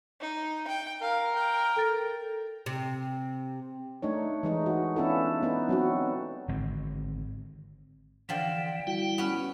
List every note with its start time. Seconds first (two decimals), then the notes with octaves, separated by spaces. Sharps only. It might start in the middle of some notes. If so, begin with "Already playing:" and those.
0.21 D#4
0.68 G5
1.02 A#4 F5
1.35 G5
1.76 A4 A6
2.66 C3
4.02 A3 D4 D#4 C#5
4.43 E3 G#3 D#4
4.66 F#4
4.96 B3 C#4 D4 E4 F4 A4
5.43 B3 D4 D#4
5.69 F#3 C4 F#4
6.48 G#1 D3 G#3 C4
8.29 D3 E3 F3 D#5 G5
8.87 G3 E4 F#4
9.18 B3 C#4